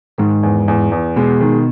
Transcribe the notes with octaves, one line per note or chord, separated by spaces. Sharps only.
G#2 D#3
E2
E2
E2
B2 G#3
D#3